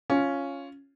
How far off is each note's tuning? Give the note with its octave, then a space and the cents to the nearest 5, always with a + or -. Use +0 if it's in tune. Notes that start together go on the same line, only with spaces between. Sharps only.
C#4 +0 F4 +0